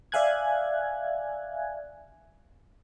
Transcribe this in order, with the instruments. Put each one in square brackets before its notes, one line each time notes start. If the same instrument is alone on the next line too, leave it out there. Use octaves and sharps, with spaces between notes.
[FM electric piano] D5 E5 F5 G#5 F#6 G#6